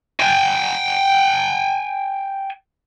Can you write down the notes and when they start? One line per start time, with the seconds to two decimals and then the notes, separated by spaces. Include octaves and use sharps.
0.20 G5 G#5